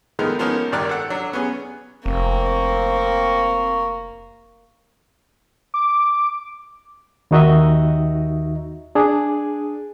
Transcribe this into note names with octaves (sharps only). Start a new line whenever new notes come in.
D#3 F3 G#3 A3 B3 D#4
F3 A#3 B3 C#4 D#4
G#1 G2 D#3 D5 F#6
A4 F#5
F#3 D4
B3 C#4 G#4
F1 A#3 C4 C#6
D6
D#2 D#3 D#4 F#4 D#5 E5
D4 G#4